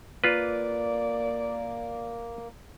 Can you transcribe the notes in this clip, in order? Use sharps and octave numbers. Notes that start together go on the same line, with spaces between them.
A#3 F4 B4 D5